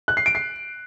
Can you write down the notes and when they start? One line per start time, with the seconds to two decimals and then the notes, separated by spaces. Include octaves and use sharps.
0.08 F#6
0.17 C7
0.26 D7
0.35 C7